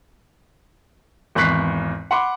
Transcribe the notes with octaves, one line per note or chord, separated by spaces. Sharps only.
G#1 E2 C#6 F#6 B6 C7
F#5 B5 C6 D6